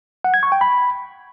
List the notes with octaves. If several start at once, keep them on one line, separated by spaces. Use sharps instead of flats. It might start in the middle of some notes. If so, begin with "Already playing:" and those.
F#5
G#6
C#6
G5
B5